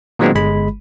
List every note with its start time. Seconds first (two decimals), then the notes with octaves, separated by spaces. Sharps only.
0.19 A#2 D#3 F#3 G#3 B3 C4
0.35 G1 G#3 B5